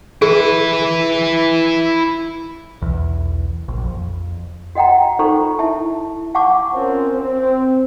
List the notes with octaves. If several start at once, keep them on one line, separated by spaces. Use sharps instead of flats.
E4 G#4 B4
B1 E2
A#1
F2
F#4 D#5 F#5 G5 A#5
D#4 F4 A4 C5 A#5 C#6
E4 E5 A5
F5 F#5 A5 C#6 D6
C4 C#4 F4 A#4 C5 C#5
C4